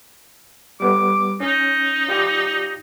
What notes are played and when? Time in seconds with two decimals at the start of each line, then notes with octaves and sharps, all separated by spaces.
0.80 G3 B3 D6
1.40 C#4 D#4
2.08 F4 G4 D5